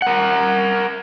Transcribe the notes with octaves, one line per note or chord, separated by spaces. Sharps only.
A#4 F#5